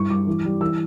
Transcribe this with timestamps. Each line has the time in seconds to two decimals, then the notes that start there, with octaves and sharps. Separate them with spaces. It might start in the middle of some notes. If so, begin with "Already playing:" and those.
Already playing: G2 E4 C#6
0.10 G2 D6
0.27 E3
0.45 G3
0.61 E3 E6